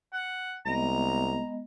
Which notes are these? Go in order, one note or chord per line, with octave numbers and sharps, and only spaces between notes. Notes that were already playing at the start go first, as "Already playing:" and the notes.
F#5
C2 G#3 B3 D#5 A#5